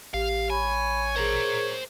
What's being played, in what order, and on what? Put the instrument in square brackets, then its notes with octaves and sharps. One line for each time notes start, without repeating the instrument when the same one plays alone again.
[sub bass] A1 [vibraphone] G4 [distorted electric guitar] F5
[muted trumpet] C#5 [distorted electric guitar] G#5 [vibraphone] B5
[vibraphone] G#4 A#4 [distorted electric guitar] C5 A#5